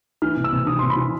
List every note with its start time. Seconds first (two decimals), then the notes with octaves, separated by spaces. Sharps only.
0.22 E3 F6
0.37 C3
0.44 E6
0.53 C3
0.67 E3 D#6
0.79 C6
0.83 C3
0.90 B5
0.97 E3 C6